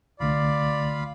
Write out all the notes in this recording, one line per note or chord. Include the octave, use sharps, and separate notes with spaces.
C2 D3 A3 F4 D5 F5 B5